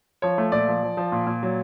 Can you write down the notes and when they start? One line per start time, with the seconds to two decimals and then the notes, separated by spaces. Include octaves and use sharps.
0.22 F3 C#5
0.38 A3
0.52 A#2 D5
0.68 F3
0.83 F3
0.97 F3
1.12 A#2
1.27 A#2
1.43 F#3